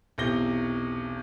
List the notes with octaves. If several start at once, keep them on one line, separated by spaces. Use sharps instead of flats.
B1 E2 C3 A#6 G7